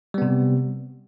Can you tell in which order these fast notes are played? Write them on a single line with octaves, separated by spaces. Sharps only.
G3 B3 C3